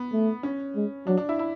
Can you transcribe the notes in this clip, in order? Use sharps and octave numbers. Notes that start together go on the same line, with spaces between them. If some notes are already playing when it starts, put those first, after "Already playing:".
Already playing: B3
A3
C#4
G#3
F#3 D4
D4
E4
E4